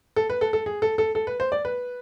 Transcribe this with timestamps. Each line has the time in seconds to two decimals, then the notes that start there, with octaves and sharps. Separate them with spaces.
0.16 A4
0.30 B4
0.41 A4
0.53 A4
0.66 G#4
0.82 A4
0.98 A4
1.15 A4
1.27 B4
1.40 C5
1.52 D5
1.65 B4